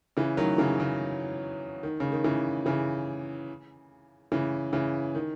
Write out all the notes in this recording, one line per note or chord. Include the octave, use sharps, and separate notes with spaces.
C#3 E3
D#3 F#3
C#3 E3
C#3
D#3
C#3
D#3
C#3 E3
C#3 E3
C#3 E3
C#3 E3
D#3